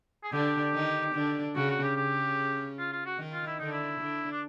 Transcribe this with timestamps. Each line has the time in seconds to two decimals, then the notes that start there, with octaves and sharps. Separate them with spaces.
0.23 G#4
0.32 D3 D4 G4
0.74 D#3 D#4
1.14 D3 D4
1.55 C#3 C#4 F#4
1.70 F#4
1.83 G4
1.96 C#3 C#4 G4
2.79 F4
2.92 F4
3.06 F#4
3.18 D#3 D#4
3.33 F4
3.47 E4
3.59 D3 D4 D#4
3.72 E4
4.00 D3 D4
4.31 D4